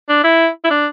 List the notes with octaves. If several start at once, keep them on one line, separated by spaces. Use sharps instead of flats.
D4
E4
E4
D4